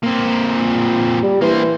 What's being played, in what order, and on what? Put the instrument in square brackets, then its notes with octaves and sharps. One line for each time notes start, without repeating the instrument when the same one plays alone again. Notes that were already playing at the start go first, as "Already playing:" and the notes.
[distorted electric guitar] A#2 C4
[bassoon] G3
[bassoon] E3 [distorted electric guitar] A#3 C5